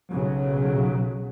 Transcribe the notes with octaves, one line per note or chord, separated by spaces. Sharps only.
B1 C#3 F#3